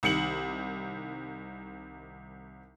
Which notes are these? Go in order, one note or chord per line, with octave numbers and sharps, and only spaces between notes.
C2 D#3 C#7 F#7